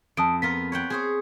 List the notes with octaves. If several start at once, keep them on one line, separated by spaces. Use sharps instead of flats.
F2 A5 D#6 D7
B3 F4 A#4 B6
C#5 F#5 G5
G#4 C5 C#5